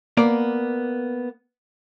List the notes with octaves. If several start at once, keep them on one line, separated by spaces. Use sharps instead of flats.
A#3 B3 D5